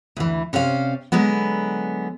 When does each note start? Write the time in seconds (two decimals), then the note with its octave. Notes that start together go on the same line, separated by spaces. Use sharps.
0.17 D2 E3
0.53 C3 C#4 C5 D5 F5
1.12 D3 F#3 G#3 B3